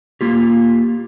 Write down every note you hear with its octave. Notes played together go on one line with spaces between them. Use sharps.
A#3 F4 G4